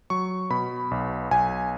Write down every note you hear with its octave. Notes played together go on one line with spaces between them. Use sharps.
F#3 C#6
B2 B5
B1
B1 G#5